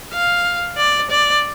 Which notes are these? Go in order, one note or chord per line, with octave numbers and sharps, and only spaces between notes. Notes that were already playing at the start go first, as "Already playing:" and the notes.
F5
D5
D5